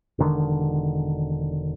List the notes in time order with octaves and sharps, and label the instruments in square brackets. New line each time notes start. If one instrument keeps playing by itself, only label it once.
[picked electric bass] E1 D3 D#3